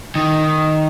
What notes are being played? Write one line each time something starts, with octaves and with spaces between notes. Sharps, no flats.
D#3